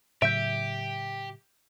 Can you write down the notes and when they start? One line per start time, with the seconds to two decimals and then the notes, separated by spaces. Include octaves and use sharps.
0.22 A2 C#3 F#3 G4 E5 G6 D7